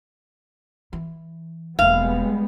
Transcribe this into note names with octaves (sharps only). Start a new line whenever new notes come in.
E3
E1 G3 G#3 A#3 B3 F5